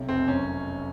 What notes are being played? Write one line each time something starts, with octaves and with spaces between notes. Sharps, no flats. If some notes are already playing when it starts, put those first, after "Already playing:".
Already playing: B1 C3
F1 C4
F#2 C#4